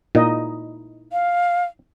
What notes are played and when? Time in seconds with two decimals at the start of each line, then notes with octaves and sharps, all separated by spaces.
0.15 A#2 D#4 E4 D#5
1.12 F5